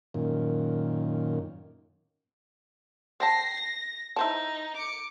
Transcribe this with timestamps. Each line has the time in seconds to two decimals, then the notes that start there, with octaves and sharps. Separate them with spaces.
0.14 F#2 A#2 D#3
3.20 C5 G5 A5 A#6 C7
3.54 A#6
4.16 D#4 E4 C5 A5
4.77 D6 C#7